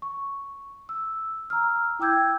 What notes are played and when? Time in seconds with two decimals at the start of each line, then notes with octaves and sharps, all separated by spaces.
0.02 C#6
0.89 E6
1.50 A#5 E6 F6
1.99 E4 G5 D6 E6 G6 G#6